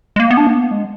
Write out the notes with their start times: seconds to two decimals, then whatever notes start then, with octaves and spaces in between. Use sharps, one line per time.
0.16 G#3
0.20 A#3
0.31 B3
0.37 D4
0.47 A#3
0.55 B3
0.71 G#3